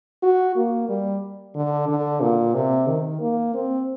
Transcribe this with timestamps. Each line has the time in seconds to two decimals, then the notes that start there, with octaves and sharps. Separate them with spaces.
0.23 F#4
0.56 A#3
0.89 G3
1.55 D3
1.89 D3
2.21 A#2
2.54 C3
2.87 D#3
3.21 A#3
3.54 C4